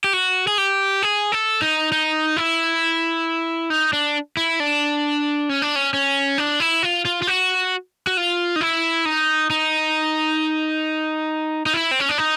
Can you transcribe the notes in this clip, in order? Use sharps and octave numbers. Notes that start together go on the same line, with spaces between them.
G4
F#4
G#4
G4
G#4
A4
D#4
D#4
E4
D#4
D4
E4
D4
C#4
D4
C#4
C#4
D4
E4
F4
F4
F4
F#4
F#4
F4
D#4
E4
D#4
D#4
D#4
E4
C4
C#4
D4
D#4